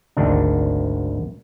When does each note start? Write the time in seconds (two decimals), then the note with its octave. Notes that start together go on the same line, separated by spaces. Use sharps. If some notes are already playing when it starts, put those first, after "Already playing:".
0.17 G#1 D2 D#3 D4